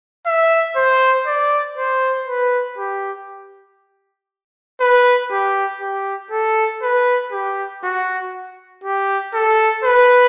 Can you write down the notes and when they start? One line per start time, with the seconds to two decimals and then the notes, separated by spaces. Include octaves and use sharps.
0.26 E5
0.76 C5
1.27 D5
1.78 C5
2.28 B4
2.78 G4
4.81 B4
5.32 G4
5.81 G4
6.31 A4
6.83 B4
7.32 G4
7.84 F#4
8.84 G4
9.34 A4
9.85 B4